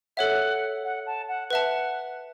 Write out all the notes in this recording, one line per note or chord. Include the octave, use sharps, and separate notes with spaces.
A4 C#5 E5 F#5
F#5
A5
F#5
B4 E5 F#5 A5